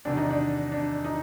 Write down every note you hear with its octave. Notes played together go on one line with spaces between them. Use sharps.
E2 C3 D#3 D4
D#4
D4
D4
D#4